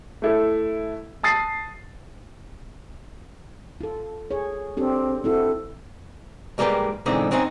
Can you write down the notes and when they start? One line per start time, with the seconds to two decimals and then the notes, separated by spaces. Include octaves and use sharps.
0.22 A3 E4 A4
1.23 A5 D#6 A6 C7
3.81 F4 A4
4.31 G#4 C#5
4.77 C4 D4 G4 A4
5.24 C4 E4 F#4 A4
6.58 G#2 G3 A#3 G#4 B4 G5
7.06 G#2 B2 D3 E3 C4 D#4
7.31 F#3 C4 C#4 D#4